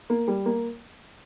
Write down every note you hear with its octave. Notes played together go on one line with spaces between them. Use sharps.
A#3
G3
A#3